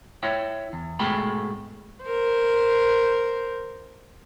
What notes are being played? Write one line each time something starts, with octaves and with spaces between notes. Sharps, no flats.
E4 C#5 E5 G5
E2
G#2 B2 A3 G#4 G5 B5
A#4 C5